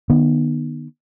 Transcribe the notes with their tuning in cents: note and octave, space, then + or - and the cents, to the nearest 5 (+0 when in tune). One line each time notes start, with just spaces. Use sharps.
D#3 -40 B3 -25